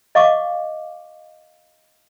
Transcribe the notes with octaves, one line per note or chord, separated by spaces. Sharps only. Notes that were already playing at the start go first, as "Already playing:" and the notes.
D#5 F5 C#6 D6